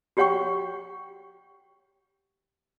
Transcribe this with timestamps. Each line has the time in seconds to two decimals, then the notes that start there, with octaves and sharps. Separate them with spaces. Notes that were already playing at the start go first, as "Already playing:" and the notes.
0.17 F#4 G4 C#5 F#5 G5 C#6